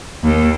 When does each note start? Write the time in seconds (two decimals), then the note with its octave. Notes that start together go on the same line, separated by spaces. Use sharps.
0.23 D#2